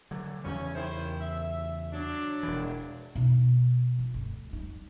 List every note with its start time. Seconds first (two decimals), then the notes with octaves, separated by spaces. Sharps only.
0.11 D3 F#3
0.44 E2 C#3 G3 C#4
0.75 D#3 E4 C5
1.21 E5
1.93 F#3 D4
2.43 E1 E3
3.15 B2 D#4
3.99 F3
4.14 D2 G2
4.53 G3 D#4